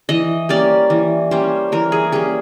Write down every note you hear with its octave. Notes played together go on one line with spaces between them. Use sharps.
E3 D#5
G3 A#3 C#4 D5
E3
G3 A#3 C#4 C5
E3 A#4
G#4
G3 A#3 C#4 G#4